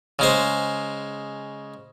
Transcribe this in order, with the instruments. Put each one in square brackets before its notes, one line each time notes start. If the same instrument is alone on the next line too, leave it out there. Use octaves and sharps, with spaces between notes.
[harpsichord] C#3 G#3 C5